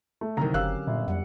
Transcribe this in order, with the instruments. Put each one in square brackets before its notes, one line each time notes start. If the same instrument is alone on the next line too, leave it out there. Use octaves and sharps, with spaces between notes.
[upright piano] A3
[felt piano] C2 D#3 [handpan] D3 F#3 C4 [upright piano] A#5
[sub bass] F#1 [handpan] C#4 G4 A#4 [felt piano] F5 [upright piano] E6 F#6
[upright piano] G1 [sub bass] A#2
[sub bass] F2 [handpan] G3 F#5